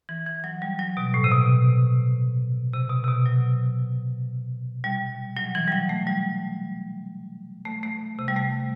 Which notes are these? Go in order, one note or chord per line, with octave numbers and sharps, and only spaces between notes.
E3
E3
F#3
G3
F#3
B2
A2
C3
B2
C3
B2
C3
B2
F#3
G3
F#3
E3
G3
F#3
A3
G3
A3
A3
C3
G3
A3